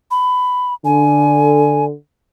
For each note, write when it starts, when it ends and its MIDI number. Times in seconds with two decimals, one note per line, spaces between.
0.11 0.74 83
0.85 1.92 50
0.85 1.85 80